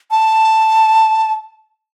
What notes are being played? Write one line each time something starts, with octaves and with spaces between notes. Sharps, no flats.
A5